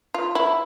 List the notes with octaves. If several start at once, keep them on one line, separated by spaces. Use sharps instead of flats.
F4
E4